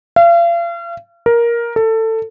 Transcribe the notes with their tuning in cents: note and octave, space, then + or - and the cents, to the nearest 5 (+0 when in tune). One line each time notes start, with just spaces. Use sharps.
F5 -40
A#4 +10
A4 +20